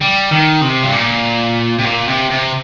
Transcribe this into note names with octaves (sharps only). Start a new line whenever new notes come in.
G3
D#3
C3
G2
A#2
C3
A#2
C3
C3